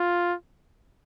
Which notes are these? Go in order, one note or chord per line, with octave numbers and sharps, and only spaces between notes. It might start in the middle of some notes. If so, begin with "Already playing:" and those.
Already playing: F4